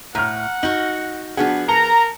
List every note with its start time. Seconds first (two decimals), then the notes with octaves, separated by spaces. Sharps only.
0.15 A2 F#5 A#5 F6
0.63 D#4 F#4 F#7
1.37 F3 B3 D4 F#4 G#4 F#5
1.68 A#4 A5 A#5 C#7 G7